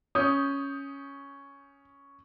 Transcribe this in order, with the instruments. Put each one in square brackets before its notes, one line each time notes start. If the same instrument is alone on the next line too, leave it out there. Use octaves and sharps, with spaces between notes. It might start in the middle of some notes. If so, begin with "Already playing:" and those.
[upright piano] C#4 G6 [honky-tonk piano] D#6